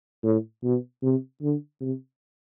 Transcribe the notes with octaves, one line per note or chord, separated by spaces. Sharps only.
A2
B2
C3
D3
C3